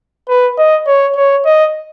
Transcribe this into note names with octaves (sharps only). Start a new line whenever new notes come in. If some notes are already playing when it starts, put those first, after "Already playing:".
B4
D#5
C#5
C#5
D#5